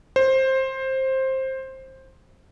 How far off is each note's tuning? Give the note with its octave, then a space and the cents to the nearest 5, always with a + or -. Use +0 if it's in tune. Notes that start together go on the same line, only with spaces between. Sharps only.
C5 +15